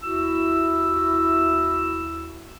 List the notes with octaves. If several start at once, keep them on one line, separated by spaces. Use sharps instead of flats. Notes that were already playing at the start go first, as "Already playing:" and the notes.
D#2 E4 F#4 E6